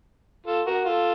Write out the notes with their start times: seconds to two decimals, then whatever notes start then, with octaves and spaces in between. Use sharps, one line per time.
0.47 F4 A4
0.67 F#4 A#4
0.85 F4 A4